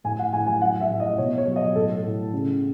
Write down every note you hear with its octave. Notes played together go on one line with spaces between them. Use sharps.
A2 G#5
F#5
A2 G#5
G#5
F#3 F#5
E5
A2
D#5
B2 C#5
C#5
F#3
D#5
A2 A4
A2
C#3